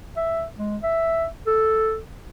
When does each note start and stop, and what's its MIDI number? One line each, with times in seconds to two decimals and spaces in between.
0.17 0.44 76
0.58 0.77 56
0.83 1.26 76
1.47 1.97 69